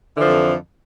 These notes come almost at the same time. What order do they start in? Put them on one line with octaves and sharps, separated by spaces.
E3 D3 F3 F2